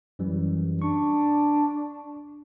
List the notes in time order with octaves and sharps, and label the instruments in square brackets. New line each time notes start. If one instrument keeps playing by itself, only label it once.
[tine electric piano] F#2 E3 G3
[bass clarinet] D4 [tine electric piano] C#6